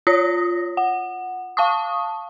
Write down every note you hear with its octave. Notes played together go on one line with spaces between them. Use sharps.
F4 C#5 D#6 A#6
F#5
F5 A5 C#6 D#6